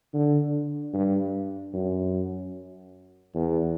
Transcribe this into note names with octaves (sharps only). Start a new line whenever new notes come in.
D3
G2
F#2
E2